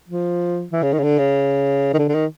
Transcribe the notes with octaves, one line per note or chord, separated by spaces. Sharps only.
F3
E3
C#3
D#3
C#3
D3
C#3
D#3
D3
D3
D#3